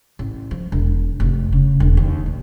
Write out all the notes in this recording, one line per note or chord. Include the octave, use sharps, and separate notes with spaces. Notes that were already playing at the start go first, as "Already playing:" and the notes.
A1
F3
E1
F1
C#3
E1
D#2
A#2